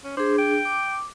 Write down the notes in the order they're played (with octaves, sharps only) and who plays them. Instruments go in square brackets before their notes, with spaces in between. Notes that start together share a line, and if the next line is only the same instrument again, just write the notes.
[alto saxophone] C#4
[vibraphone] D4 G#4 [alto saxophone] C5
[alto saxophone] G5
[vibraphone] D6